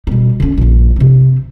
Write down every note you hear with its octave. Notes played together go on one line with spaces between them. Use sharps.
B2 G3
D3 C#4
A#1 G2
C3 C4